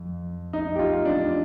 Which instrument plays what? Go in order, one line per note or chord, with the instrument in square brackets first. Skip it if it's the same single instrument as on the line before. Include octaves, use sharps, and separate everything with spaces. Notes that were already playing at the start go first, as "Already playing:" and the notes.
Already playing: [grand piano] F2
D#4
G4
F4
D4